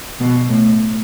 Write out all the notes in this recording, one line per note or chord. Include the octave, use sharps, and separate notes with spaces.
B2
A2